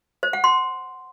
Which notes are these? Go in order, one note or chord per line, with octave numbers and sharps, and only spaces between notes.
C5
F#5
C6